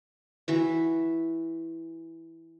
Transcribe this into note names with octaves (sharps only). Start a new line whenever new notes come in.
E3 F#4 E5